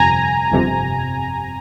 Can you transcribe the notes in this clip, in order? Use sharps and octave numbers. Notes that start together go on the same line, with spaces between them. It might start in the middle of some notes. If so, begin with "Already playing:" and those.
Already playing: G1 F2 C3 G#5 A#5
G1 F2 C3